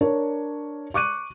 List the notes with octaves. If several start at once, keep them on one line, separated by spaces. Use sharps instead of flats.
D4 A#4 C#5
C#6 D6 F#6 D#7